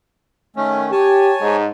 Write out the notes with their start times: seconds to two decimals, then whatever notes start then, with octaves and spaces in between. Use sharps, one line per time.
0.56 D#3 A3 C#4
0.92 G4 C#5 G#5 A5
1.41 G#2